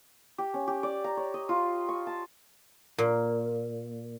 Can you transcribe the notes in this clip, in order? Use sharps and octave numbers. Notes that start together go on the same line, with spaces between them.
G4
C#4
G4
D5
A#5
C#5
D#5
F4
C#6
A5
A#2